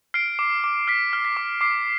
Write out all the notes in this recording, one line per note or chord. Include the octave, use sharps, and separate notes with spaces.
F6 C7 D7
D6
D6
F6 B6
F6
B6
D6
D6 C7